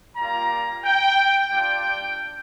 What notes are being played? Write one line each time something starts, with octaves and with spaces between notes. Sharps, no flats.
G3 A#3 F4 A#5
G5
G3 D4 F4 G5